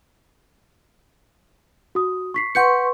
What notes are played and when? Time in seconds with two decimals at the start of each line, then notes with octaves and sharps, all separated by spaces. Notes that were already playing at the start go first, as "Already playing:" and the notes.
1.95 F#4 D#6
2.34 C#6 B6 C7
2.55 B4 F#5 C6 C#6 G6 C#7